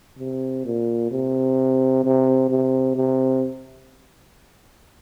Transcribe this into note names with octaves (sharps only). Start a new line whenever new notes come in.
C3
A#2
C3
C3
C3
C3